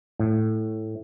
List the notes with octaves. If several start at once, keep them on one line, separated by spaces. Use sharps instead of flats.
A2